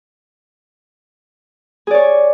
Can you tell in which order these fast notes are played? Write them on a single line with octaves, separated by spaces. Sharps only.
G#4 D5 C#5